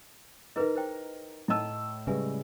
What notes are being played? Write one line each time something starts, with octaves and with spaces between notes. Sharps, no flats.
D#4 E4 G#4 A#4 B4
E4 C5 G5
A2 E4 D#5 A5 E6
C#3 G3 G#3 B4 E5 G#5